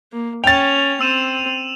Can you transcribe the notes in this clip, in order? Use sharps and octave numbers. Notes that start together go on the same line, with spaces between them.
A#3
C#4 G5 A6 F7
C4 E6 D#7 E7